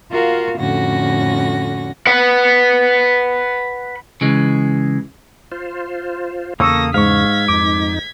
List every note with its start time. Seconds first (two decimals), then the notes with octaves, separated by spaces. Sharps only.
0.10 F4 F#4 A#4 F5
0.57 F2 A2 D3 C#4 F#4 A#6
2.07 B4 F#5
4.21 C#3 E3 G#3
5.52 F4 C5
6.60 E2 C#3 A#3 A4 C#6 D#6 E6 A#6
6.94 G#2 F5 C#6 G#6 B6
7.48 F2 D#4 D6